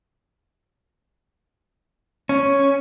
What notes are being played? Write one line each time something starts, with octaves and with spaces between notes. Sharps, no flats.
C#4